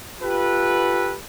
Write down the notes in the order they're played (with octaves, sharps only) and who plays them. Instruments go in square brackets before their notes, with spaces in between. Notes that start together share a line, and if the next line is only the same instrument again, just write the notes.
[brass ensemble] F4 G4 A4 B4